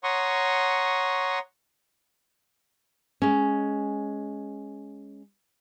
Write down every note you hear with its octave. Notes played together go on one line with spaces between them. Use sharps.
C#5 F#5 A#5 C6 C#6 D#6
G#3 C#4